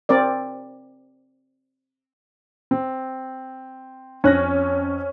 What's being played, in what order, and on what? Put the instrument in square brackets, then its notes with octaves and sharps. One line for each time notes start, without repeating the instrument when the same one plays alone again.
[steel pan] C4 A#4 D5
[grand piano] C4
[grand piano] F2 F#6 A#6 [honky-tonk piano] C#4